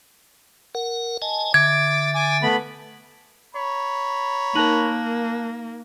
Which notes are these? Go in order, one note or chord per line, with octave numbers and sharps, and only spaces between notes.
A#4 F#5
D#5 G#5 A5
D3 E5 D6 G#6
G#5 D6
A3 B3 B5
C#5 A#5 B5
A#3 D#4 A#4 A5 F#6 F#7